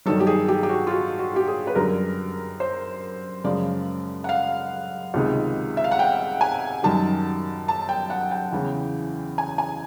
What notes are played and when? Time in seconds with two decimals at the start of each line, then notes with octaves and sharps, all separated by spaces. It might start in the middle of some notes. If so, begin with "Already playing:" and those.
0.06 G2 D#3 F#3 A4
0.20 G4
0.27 G#4
0.48 G4
0.63 G4
0.69 F#4
0.87 F4
0.91 F#4
1.19 F#4
1.36 G4
1.48 G#4
1.67 B4
1.75 F#2 D3 G3 A#4
2.60 C5
3.44 F#2 C#3 F3 G#3 D5
4.24 F#5
4.29 F5
5.14 C#2 C3 D#3 G#3
5.77 E5
5.84 F5
5.91 F#5
5.99 G5
6.41 G#5
6.83 F#2 D#3 G3 A5
7.68 A5
7.89 G5
8.10 F#5
8.31 G5
8.52 E2 C#3 E3
9.38 G#5
9.58 G#5